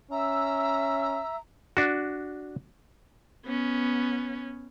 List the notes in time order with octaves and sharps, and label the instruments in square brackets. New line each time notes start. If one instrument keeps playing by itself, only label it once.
[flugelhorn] C#4 [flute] E5 [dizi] A#5 [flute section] E6
[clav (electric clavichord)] D4 F#4
[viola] B3 C#4